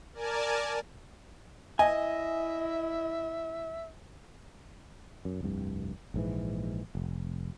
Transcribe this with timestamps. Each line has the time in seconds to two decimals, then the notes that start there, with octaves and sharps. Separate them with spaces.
0.14 A#4 D5 G#5 A5
1.79 E4 D#5 E5 G#5
5.25 F#2
5.41 F1 C2 G2
6.14 A#1 G#2 E3
6.95 F1